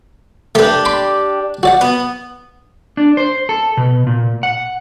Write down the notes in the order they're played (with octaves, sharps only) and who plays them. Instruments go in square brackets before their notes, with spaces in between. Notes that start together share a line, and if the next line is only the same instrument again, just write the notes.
[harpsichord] A3 B4 [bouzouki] D4 G4
[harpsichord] B5 C6 D6
F#4 D5 F#5
[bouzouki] B3
[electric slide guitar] D4
C5
A4
B2
A#2
F#5